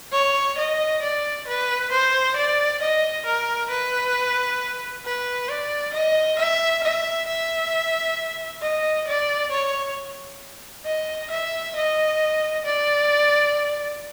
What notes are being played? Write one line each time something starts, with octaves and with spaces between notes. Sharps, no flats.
C#5
D#5
D5
B4
C5
D5
D#5
A#4
B4
B4
D5
D#5
E5
E5
E5
D#5
D5
C#5
D#5
E5
D#5
D5